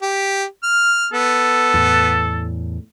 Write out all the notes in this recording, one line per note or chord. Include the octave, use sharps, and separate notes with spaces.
G4
F6
B3 A4
E2 A2